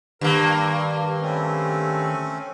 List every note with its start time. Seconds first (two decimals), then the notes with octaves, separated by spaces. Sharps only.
0.21 G2 D#3 A#3 A#4
1.21 A3 C4 C#4